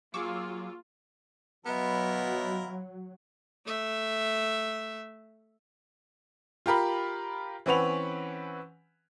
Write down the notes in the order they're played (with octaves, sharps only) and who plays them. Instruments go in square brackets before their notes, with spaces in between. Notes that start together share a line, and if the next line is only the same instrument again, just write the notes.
[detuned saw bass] F#3 [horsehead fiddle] A#3 G#4 [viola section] F4 [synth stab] C#6 D6 E6
[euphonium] B2 [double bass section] F#3 [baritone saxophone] B3 [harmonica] E4 F4 A#4
[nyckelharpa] A3 E5
[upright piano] F4 G4 A#4 B5
E3 C4 C#4 B4 F#5 F7